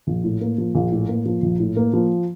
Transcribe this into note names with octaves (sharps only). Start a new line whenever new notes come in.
A#1
A2
A#3
F3
A#1
A2
A#3
F3
A#1
A2
A#3
F3